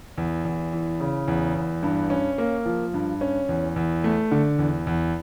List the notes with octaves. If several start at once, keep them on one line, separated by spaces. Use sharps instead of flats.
E2
E2
E3
C#3
E2
E2
G2
C#4
A#3
F3
G2
C#4
E2
E2
A3
D3
E2
E2